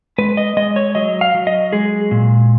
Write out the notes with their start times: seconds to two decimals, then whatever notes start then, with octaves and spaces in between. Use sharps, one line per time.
0.18 G#3 B4
0.37 D#5
0.57 G#3 D#5
0.76 C#5
0.95 F#3 D#5
1.21 F5
1.35 F#3
1.47 D#5
1.73 G#3 G#4
2.11 A#2